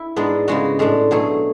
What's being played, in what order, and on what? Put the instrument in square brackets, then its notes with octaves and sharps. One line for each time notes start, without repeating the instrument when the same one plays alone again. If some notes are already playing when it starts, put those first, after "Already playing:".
Already playing: [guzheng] E4
G#2 G#3 B3 D4
C#3 G#3 B3 F#4
A2 G#3 D4
B2 F#3 A3 G#4